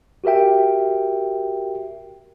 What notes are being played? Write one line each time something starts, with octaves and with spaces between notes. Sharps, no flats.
F#4 G4 A#4 E5 G5